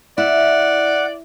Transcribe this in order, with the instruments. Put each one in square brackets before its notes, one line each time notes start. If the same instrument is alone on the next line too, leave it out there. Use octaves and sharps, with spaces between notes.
[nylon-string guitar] E4 [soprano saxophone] D5 [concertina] F#5